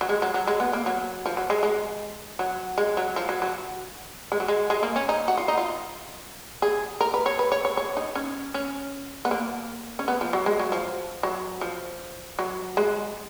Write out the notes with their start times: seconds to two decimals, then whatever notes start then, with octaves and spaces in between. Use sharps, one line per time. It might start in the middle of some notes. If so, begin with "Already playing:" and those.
0.01 F#3
0.09 G#3
0.22 F#3
0.34 F#3
0.47 G#3
0.60 B3
0.73 A#3
0.86 F#3
1.26 F3
1.37 F#3
1.50 G#3
1.63 G#3
2.39 F#3
2.78 G#3
2.97 F#3
3.16 F3
3.29 F#3
3.42 F#3
4.32 G#3
4.40 F#3
4.48 G#3
4.70 G#3
4.83 A#3
4.96 C#4
5.09 D#4
5.28 F#4
5.38 F4
5.48 D#4
5.58 F4
6.62 G#4
7.01 A#4
7.14 B4
7.26 C#5
7.39 B4
7.52 C#5
7.65 C#5
7.77 C#5
7.97 D#4
8.15 C#4
8.54 C#4
9.25 B3
9.31 A#3
9.99 C#4
10.08 B3
10.21 F3
10.33 F#3
10.46 G#3
10.59 F#3
10.72 F3
11.23 F#3
11.61 F3
12.39 F#3
12.77 G#3